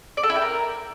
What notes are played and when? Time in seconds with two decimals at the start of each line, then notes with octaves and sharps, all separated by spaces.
0.17 D5
0.23 A4
0.30 E4
0.36 G5
0.42 A#4